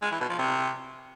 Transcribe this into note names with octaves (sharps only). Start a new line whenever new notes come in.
G#3
E3
B2
F3
C3